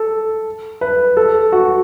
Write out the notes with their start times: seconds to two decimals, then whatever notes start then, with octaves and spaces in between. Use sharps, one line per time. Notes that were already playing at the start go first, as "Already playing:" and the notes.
Already playing: A4
0.81 B4
1.17 A4
1.52 F#4